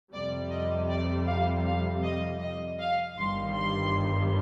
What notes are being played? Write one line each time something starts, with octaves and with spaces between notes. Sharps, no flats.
F2 C3 G3 D5
D#5
D5
F5
F5
D#5
D#5
F5
G1 G2 D#3 G3 C6
C6